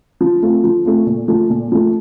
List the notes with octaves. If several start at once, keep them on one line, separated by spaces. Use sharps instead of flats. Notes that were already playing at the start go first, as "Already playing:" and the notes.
F3
A3 C4 F4
F3
A3 C4 F4
A#2
F3 A3
A#2
F3 A3